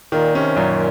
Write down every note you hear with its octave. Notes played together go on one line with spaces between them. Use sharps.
A#2 D#3
C3 C#4
F#2 A#2